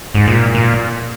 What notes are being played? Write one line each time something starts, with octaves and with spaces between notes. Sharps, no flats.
G#2
A#2
A#2